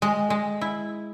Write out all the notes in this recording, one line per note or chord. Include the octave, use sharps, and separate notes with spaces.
G#3
G#3
E4